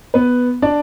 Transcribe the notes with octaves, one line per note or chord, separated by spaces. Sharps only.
B3 B4
D4 D5